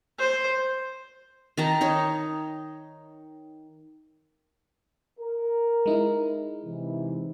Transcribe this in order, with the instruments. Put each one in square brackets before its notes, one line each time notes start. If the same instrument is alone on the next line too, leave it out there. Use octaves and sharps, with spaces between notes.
[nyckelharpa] C5
[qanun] D#3 A5 A#5
D#4 C#5
[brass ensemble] A#4
[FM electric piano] G#3 D#4 E4
[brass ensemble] C3 E3